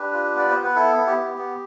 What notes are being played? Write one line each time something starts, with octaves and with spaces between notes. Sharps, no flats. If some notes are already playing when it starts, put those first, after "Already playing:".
Already playing: D4 G4 B4
F4
B3 D5
B3 C5
B4
E4 A4
B3
G4
B3
B3